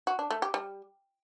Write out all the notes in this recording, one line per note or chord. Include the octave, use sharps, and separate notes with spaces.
F#4
D4
A3
G4
G3